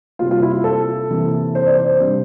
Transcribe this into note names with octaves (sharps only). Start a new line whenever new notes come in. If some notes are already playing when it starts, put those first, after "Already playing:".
C3 G3 A#3 F4
F4
E4
F4
A4
C3 E3 A#3
C5
D5
C5
C3 G3 D4